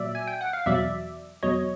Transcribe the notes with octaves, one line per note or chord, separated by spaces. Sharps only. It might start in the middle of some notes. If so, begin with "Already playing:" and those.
Already playing: A#2 F#3 D5 E5
G#5
G5
F#5
F5
E2 B2 F#3 D5 E5
E2 B2 F#3 C#5 D#5